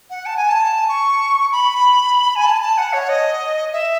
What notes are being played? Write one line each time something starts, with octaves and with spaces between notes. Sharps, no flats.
F#5
A5
G#5
A5
C#6
B5
G#5
A5
A5
F#5
C#5
D#5
E5